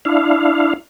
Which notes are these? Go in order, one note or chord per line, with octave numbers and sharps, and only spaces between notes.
D4 E4 F5